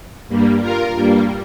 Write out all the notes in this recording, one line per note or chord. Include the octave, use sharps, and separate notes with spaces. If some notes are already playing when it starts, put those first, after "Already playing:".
G2 G3 A#3
F4 A#4
G2 G3 A#3